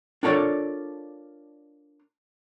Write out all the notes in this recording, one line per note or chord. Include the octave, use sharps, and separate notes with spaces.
D4 F4 A4 A#4 C#5 D5